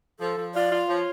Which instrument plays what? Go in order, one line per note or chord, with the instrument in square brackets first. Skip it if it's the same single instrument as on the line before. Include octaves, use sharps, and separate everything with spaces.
[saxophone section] F3 [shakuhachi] A4
[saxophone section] F3
[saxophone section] F4 [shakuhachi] D5
[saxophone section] F4
[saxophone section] F3 [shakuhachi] C#5